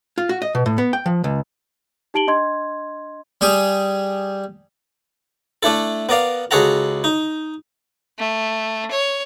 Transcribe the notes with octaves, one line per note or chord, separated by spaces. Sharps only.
F4
F#4
D#5
B2
A2
B3
G5
F3
C#2
D#4 G4 A5 D7 F#7 G7
D4 D#5 C6 G#6
G3 G4 G#4
A3 D4 E4 A4
B3 A#4 D5 F5
C#2 F#4 G#4 A4 F#5 A#5
D#4
A3
C#5